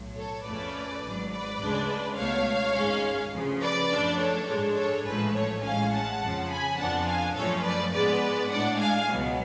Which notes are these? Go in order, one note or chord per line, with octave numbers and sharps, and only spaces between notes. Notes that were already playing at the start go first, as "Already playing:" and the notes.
Already playing: B1 A2 F#3
A4 C#5
F2 F3 A3 C#4 B4 D5
G#1 G#2 F#3
B4 D5
D2 C#3 G#3 D4
C#2 B2 A3 C#5 F5
G#1 G#2 G#3 C#4
D2 C#3 F3
B4 D5
F#2 F3 A3 D4
A4 C#5
G#2 G#3 D4
A4 C#5
A1 G#2 F3 A3 G#4 B4
A4 C#5
A1 A2 G#3 C#4 F5 G#5
F#5 A5
F2 C#3 F3
G#5 B5
F2 F3 B3 D4 F#5 A5
F5 G#5
F#2 F3 A3 C#4 A4 C#5
B4 D5
G#2 G#3 B3 B4 D5
A2 G#3 D4 D5 F#5
F5 G#5
C#2 B2 F#3 B3